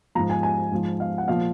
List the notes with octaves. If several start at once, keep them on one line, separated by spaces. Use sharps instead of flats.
G#2 F3 A#5
G#5
G#5
G#2 F3
F5
F#5
A#2 F3 F5